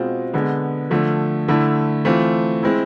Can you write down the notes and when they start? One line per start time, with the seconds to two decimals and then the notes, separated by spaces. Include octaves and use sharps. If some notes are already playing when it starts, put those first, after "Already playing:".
Already playing: B2 G#3 C4 F4
0.33 D3 G#3 B3
0.90 D3 F3 A3
1.48 D3 A3 E4
2.05 E3 A3 C4 F4
2.63 G#3 C4 E4